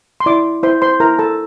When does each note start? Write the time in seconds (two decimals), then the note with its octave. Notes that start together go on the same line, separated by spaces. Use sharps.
0.20 C6
0.26 E4 D5 D6
0.63 E4 C5 C6
0.82 C5 C6
1.00 E4 A#4 A#5
1.19 A4 A5